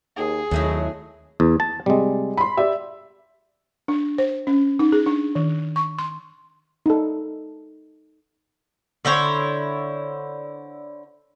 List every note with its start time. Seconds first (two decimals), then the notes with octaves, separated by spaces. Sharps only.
0.17 D#2 G#4
0.51 G#1 D#2 F#3 A3 D#4 E4
1.40 E2
1.60 A5
1.86 C3 G3 G#3
2.37 B5 C6
2.57 G4 D5 E5
3.88 D4
4.18 C5
4.47 C#4
4.79 D#4
4.92 G#4
5.06 D4
5.35 D#3
5.76 C#6
5.99 C6
6.86 D#4 A4
9.05 D3 E4 C5 C#5